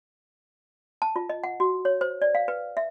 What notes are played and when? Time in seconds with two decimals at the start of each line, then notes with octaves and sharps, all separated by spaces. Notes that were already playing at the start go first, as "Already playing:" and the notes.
1.02 A5
1.16 F4
1.29 D#5
1.44 F#5
1.60 F#4
1.85 C#5
2.01 C5
2.22 D5
2.35 F5
2.48 B4
2.77 E5